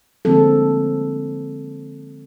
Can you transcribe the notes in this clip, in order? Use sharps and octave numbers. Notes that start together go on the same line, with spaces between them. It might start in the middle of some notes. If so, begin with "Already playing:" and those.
D3 F3 G#3 A#3 C4 A4